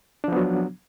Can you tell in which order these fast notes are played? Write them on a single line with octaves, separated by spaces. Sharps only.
D4 F3 B3 F#3